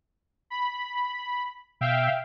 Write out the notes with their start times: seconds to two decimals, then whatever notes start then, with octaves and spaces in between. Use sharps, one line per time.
0.50 B5
1.81 B2 E5 F5 G5